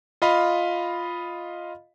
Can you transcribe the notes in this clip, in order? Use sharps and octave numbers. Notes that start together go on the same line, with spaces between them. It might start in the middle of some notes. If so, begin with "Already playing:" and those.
F4 D#5 F5 B5